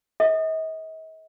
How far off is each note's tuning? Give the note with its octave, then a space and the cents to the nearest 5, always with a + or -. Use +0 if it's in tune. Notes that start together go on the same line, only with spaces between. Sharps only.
A4 +0 D#5 +45